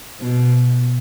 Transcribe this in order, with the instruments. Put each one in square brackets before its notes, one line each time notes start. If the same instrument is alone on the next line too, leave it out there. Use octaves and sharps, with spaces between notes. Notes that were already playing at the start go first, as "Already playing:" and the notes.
[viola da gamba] B2